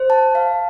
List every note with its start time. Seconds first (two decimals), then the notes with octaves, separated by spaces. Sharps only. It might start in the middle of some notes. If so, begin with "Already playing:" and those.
Already playing: C5
0.10 A5
0.35 F5